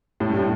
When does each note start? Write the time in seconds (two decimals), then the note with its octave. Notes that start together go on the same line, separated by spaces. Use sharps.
0.20 A2
0.30 G2
0.38 A2